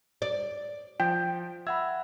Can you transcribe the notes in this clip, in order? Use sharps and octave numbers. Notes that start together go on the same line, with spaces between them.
D5
F3 G5
E5 F#5 B5 E6 G#6